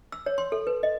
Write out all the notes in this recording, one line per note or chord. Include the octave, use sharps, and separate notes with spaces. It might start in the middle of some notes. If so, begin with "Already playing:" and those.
E6
C#5
C6
A4
B4
D#5